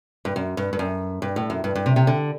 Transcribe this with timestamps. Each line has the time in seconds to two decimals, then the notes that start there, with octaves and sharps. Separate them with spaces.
0.25 G2
0.36 F#2
0.57 G2
0.73 G2
0.79 F#2
1.22 G2
1.36 A2
1.50 F#2
1.64 G2
1.76 G2
1.86 C3
1.96 C3
2.07 D3